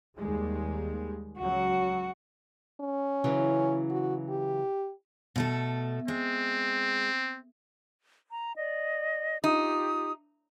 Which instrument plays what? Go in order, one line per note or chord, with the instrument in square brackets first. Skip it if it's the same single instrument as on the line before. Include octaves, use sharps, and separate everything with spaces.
[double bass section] D#2 G3 G#3
[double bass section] C#2 F#3 [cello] F#4
[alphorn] C#4
[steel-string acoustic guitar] C#3 E3 F#3
[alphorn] F#4
G4
[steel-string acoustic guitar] B2 A3 A4
[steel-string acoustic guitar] G#3 [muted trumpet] C4
[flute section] A#5
D5 D#5
[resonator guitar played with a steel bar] D#4 [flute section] F4 G4 D#6